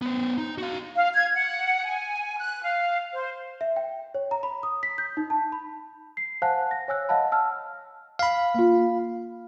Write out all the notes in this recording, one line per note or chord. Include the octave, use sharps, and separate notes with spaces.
B3 C5
D#4
F#4 F5
F5
G#6
F#5
G#5
F#6
F5
C5
E5
G5
C#5
A#5
B5
D#6
B6
G6
D#4
A5
B5
C7
C5 F5 F#5 G#5 A5 F#6
A#6
C#5 G#5 E6 F#6
D#5 F5 F#5 A5 B5
A5 E6 F6
F5 B5
A#3 F4